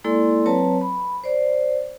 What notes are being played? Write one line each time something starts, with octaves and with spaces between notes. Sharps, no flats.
G#3 A#3 E4 A4 D5 C6
F#3 C4 B4 C#5 A5 A#5
B5
C5 D5